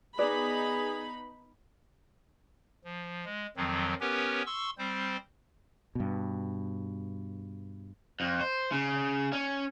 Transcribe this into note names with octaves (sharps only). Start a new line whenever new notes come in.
B3 D#4 G#4 B4 D5 B5
F3
G#3
F2 D#3 F3 F#3 C4
B3 C#4 G4 A#4 B4 C#5
C6 C#6 E6
G3 C4 C5
G2 B2
F2
C5
C#3
C#4